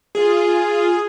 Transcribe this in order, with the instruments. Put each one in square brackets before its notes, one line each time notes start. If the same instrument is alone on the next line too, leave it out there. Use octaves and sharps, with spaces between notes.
[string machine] F4 [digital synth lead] G#4